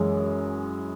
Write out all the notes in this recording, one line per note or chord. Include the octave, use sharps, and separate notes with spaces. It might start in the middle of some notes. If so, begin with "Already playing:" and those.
Already playing: F#2 E3 G#3